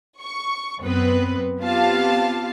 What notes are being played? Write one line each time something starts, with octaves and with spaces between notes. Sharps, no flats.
C#6
F#2 B3 C4 B4
B3 C4 F4 G4 F5 A5